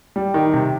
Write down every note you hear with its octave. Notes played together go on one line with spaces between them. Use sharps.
G3
D#3
C3